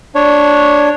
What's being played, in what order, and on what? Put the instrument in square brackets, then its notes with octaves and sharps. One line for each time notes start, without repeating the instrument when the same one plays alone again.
[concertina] D4 C#5